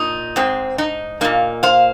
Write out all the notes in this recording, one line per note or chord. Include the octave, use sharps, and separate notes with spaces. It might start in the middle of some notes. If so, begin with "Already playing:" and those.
Already playing: A#2 D#4
G#2 G#3 C4
D#4
A#2 A#3 D#4
C5 F5